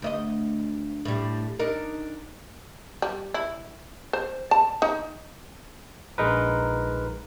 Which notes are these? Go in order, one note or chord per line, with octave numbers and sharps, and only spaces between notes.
D2 D#4 D#5
A2 G3
D4 D#4 A#4
G3
E4
C5
A5
D#4
A#1 G#3 D#4 A#4 B4